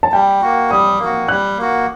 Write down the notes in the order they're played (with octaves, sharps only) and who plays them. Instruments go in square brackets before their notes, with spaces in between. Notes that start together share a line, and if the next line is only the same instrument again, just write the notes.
[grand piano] A5
[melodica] G3 [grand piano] G5
[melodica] A#3 F#4
[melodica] G3 [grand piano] D#6
[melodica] A#3
F#4
[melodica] G3 [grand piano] F#6
[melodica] A#3 F#4